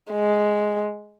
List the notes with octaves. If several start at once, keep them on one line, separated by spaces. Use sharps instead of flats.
G#3